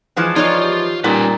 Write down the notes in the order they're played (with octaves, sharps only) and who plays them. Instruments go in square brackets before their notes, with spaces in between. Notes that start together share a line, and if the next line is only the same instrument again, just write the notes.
[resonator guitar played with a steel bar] E3 F3 G#3
[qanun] D#4 C#5 F5 [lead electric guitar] F4 C6 [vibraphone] D5
[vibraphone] G4
[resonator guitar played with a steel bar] A#2 [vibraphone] G3 D#4 G4 [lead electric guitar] C#4 B4